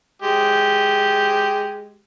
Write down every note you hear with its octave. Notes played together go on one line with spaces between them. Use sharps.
G#3 G4